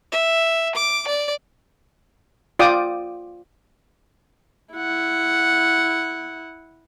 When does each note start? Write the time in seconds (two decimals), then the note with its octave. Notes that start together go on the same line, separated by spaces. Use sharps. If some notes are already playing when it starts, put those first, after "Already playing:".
0.12 E5
0.75 D6
1.07 D5
2.59 F4 D5 G5 D6 D#6
4.74 E4 F#5